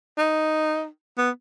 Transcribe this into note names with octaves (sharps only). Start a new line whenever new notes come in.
D#4
B3